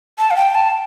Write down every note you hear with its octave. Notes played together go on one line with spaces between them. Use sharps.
A5
F5
G5
A5